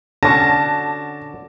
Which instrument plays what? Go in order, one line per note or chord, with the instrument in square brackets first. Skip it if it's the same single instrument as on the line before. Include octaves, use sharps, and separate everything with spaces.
[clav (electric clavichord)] D3 C#4 F#4 [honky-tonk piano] A5 [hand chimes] D6 A#6